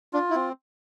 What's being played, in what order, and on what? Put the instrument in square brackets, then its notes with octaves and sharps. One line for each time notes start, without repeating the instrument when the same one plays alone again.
[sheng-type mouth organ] D4 [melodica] F4
[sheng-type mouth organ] E4
[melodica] C4